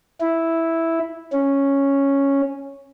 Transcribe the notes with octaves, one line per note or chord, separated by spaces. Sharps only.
E4
C#4